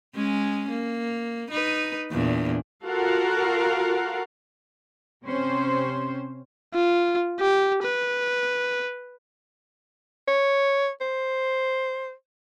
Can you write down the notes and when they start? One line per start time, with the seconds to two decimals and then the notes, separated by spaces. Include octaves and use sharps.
0.15 G#3 C#4
0.69 A#3
1.51 D#4 B4
2.11 E2 A#2 D4
2.85 F4 F#4 A4 A#4 F5 F#5
5.23 C3 C#4 C5
6.74 F4
7.40 G4
7.84 B4
10.28 C#5
11.01 C5